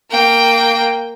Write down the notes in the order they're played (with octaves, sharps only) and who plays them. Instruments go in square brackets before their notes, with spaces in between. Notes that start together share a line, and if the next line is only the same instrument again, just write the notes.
[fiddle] A#3 G5